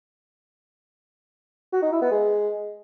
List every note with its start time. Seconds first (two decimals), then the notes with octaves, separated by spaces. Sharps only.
1.72 F#4
1.82 D#4
1.92 E4
2.02 B3
2.11 G#3